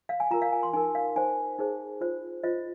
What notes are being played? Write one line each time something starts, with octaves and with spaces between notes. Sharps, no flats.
F5
G#5
F4 A#4 A#5
F5
G#5
C6
D#4 A#4 G#5
F5
D#4 C5 G#5
D#4 G#4 C5
F4 C5
F4 C5 D#5